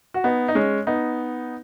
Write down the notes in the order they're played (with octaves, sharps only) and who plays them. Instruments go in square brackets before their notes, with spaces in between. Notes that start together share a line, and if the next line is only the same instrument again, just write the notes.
[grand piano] F#4
B3 D#4
D#4
G#3 C#4
B3 D#4